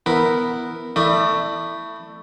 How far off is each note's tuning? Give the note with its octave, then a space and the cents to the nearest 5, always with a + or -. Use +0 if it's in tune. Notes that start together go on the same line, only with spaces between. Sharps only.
B3 +0 E4 +0 A#4 +0
A3 +15 E4 +0 D5 +40